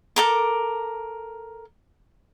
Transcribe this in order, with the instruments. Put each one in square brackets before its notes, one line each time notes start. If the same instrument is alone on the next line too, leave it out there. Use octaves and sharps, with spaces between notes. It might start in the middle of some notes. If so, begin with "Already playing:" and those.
[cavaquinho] A4 A#4 D6